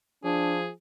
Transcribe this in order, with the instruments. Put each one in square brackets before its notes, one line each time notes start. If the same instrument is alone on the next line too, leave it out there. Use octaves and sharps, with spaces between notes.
[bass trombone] F3 [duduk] D4 [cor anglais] G#4